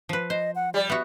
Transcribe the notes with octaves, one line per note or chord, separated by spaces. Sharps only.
F3 B4
C5 D#5
F#5
G3 D5
B3 F#4 E5